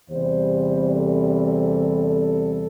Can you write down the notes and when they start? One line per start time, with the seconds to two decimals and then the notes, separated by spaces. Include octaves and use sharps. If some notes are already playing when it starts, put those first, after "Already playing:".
0.10 E2 C3 G3 C4 C5
0.93 A4